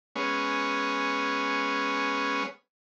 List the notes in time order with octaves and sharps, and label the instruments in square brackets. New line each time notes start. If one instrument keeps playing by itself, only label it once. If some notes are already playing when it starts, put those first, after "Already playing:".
[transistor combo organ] G#3 B3 C#4